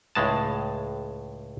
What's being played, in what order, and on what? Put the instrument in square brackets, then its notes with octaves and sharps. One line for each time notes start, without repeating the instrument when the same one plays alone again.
[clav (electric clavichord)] C#2 A2 G#3 A5